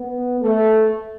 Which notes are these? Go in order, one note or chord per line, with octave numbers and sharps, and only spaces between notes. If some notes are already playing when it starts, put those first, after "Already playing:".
Already playing: B3
A3